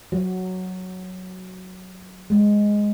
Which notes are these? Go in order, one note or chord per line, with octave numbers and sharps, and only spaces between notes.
F#3
G#3